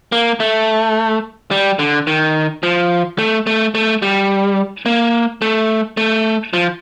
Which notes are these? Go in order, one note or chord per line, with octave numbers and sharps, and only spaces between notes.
A#3
A3
G3
D3
D#3
F3
A3
A3
A3
G3
A#3
A3
A3
F3